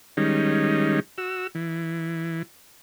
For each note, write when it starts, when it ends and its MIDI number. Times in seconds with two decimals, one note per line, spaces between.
0.17 1.00 51
0.17 1.00 55
0.17 1.00 56
0.17 1.00 61
0.17 1.00 63
1.18 1.47 66
1.18 1.47 88
1.55 2.42 52